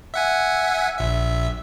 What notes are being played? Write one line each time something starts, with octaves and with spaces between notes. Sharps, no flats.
E5 F#5 G#5
A#1 E5